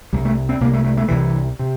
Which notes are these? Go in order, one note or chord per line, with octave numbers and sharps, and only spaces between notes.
C2 C3 G3
A3
C4
C2 C3 A#3
A3
A3
A3
C2 C3 E3
C3